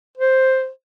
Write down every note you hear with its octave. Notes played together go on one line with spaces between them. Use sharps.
C5